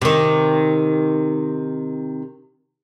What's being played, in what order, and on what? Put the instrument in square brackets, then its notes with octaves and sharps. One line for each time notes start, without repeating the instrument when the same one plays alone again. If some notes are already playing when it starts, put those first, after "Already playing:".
[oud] C3 D#3